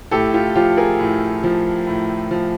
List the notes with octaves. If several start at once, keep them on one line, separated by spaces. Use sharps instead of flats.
A2 G4 A4
F4 G4
F3 F4 G4
G#4 A#4
A2
F3
A2
F3